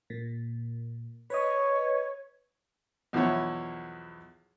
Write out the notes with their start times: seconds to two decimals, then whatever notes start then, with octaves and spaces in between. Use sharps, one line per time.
0.10 A#2
1.30 B4 C#5 D#5
3.13 B1 E2 F3 E4 C#5